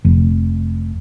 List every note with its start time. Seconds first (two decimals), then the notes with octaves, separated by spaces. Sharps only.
0.04 F1